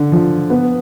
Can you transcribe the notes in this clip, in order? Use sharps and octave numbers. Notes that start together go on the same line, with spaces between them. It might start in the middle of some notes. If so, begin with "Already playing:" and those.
Already playing: D3
F3
B3